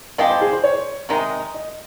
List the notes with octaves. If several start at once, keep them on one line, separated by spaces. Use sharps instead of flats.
F3 G#3 C4 G4 D#5
C5
G#4
C5
C#5
C3 D#3 G#3 D#4 D#5
D#5